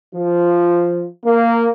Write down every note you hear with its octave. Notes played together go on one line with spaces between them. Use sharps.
F3
A#3